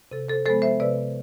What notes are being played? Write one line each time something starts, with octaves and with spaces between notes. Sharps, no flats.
C3 A4
A4 C5
F3 G#3 B3 A4 C5
C5 E5
C3 B4 D5